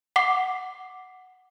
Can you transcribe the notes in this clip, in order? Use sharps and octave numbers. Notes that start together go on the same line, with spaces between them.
F#5 D6 C7